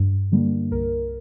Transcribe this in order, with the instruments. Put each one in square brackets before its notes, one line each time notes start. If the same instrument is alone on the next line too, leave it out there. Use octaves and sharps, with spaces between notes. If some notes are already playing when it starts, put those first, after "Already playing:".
Already playing: [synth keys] G2
D3 G3 A#3
C2 A#4